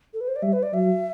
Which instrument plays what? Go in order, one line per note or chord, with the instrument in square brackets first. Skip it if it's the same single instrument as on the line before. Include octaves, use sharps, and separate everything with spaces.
[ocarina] A4
B4
C5
D5
[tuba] G3 [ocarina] E5
[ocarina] B4
D5
[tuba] F#3 [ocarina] E5